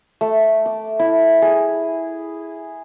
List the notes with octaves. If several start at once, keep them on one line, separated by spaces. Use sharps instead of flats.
A3
D6
E4
G#4